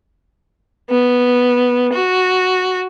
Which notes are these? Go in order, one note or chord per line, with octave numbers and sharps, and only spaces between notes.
B3
F#4